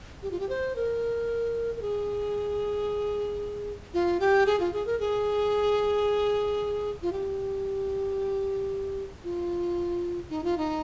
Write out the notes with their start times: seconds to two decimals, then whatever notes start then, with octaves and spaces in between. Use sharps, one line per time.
0.23 G4
0.31 F4
0.40 G4
0.49 C5
0.76 A#4
1.77 A#4
1.82 G#4
3.94 F4
4.20 G4
4.46 G#4
4.60 F4
4.73 G#4
4.86 A#4
5.00 G#4
7.02 F4
7.12 G4
9.24 F4
10.30 D#4
10.44 F4
10.58 D#4